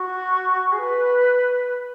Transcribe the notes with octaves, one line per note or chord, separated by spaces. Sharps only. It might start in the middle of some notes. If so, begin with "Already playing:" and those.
Already playing: F#4
G#4
B4